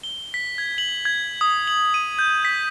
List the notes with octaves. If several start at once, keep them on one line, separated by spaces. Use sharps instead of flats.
G7
B6
G#6
F#7
G#6
D#6
F#7
D#7
G6
B6